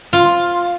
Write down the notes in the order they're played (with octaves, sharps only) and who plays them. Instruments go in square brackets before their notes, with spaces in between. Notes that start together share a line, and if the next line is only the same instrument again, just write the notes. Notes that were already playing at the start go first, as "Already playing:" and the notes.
[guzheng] F4